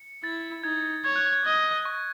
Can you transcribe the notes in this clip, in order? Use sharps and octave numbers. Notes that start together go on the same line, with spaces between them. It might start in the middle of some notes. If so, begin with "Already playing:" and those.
Already playing: C#7
E4 A6
D#4 G#6
C#5 G#6
F#6
G#6
D#5
C#6